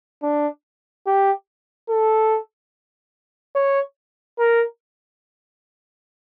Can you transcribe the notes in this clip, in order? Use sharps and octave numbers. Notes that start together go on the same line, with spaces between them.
D4
G4
A4
C#5
A#4